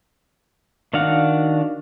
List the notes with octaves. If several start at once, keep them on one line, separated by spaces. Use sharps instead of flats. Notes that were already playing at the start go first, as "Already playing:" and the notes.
D#3 D4 F#4 F5 F#5